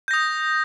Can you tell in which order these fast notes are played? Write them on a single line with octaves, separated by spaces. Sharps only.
G6 A#6 D#6